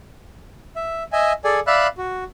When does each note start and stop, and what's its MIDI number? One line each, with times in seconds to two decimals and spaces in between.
0.76 1.03 76
1.13 1.33 75
1.13 1.33 76
1.13 1.33 80
1.44 1.60 68
1.44 1.60 69
1.44 1.60 74
1.44 1.60 80
1.67 1.87 74
1.67 1.87 76
1.67 1.87 77
1.67 1.87 83
1.67 1.87 88
1.67 1.87 90
1.98 2.24 66